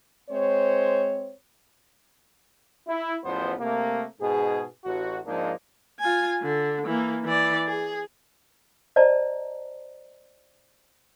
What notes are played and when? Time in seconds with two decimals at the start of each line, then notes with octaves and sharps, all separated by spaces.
0.30 G#3 C4 C5 C#5
2.88 E4
3.24 A1 E2 F3 B3 C5
3.60 C3 A3 A#3
4.21 G#2 B2 G#4
4.85 A1 F#4
5.26 G#2 F3 A#3 D4 D#4
6.00 F4 G#5
6.42 D3
6.87 E3 A#3
7.24 E3 D5
7.67 G#4
8.96 C5 D5 D#5 A5 A#5